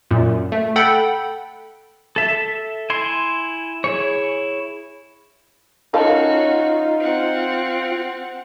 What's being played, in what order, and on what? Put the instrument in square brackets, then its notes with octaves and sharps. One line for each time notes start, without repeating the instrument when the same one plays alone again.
[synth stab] F#2 A#2
A3
A4 F#5 G5 B5
[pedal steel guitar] A4 E5
E4 G#5 C6
E4 G#4 C#5
[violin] C#4 F#4 [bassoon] D#4 [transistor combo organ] F4 [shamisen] A#4 F5 A5
[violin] C4 F#5